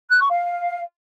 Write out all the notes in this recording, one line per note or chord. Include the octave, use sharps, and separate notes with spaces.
F#6
C#6
F5